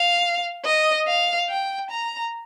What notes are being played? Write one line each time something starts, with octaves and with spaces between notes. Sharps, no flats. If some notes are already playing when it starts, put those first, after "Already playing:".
Already playing: F5
D#5
F5
G5
A#5